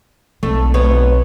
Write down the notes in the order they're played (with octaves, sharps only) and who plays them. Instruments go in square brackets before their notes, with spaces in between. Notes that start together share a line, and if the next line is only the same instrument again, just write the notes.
[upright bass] B1 C4 [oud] A3
[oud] B3 C#5